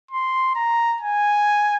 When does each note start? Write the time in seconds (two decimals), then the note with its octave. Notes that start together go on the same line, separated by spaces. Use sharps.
0.11 C6
0.55 A#5
1.01 G#5